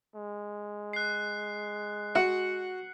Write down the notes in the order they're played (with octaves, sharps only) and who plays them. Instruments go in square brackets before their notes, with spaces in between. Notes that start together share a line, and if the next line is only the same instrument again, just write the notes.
[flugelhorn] G#3
[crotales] F#6 C7
[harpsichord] F#4 [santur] F#5